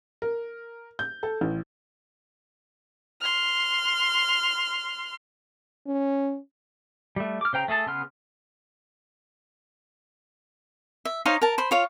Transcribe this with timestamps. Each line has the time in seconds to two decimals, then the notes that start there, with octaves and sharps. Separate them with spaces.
0.22 A#4
0.99 G6
1.23 A4
1.41 A1
3.21 C6 F6
5.87 C#4
7.16 G3 A3
7.41 D6 F6
7.53 C#3 C5 G5 A#5
7.68 A3 G#4 A4 A5
7.87 C#3 B3 C6 F6
11.05 E5
11.26 D#4 C5 C#5 F5
11.42 A#4 A5
11.58 C5 B5
11.71 F4 C#5 F5